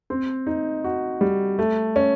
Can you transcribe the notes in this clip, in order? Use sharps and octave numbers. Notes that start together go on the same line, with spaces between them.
C4
D#4
F#4
G3
A3
C#4